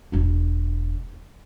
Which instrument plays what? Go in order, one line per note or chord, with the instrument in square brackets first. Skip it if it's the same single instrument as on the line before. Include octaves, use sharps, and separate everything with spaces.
[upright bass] E1 D4